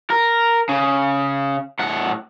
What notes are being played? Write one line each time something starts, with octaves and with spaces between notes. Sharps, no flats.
A#4
C#3
A2 F#5